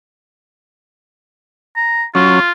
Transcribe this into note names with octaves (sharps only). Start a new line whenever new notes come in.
A#5
F#3 C#4 F4